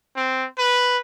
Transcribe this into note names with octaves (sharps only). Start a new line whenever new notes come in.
C4
B4